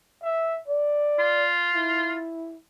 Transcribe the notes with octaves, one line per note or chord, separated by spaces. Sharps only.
E5
D5
F4
E4